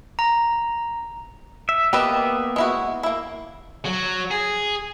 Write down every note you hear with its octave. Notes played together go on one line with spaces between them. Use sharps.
A#5
E5
A#3 B3 G4 B4 D#5 E5
G#3 E4 F#4
A#3 E4
F#3
G#4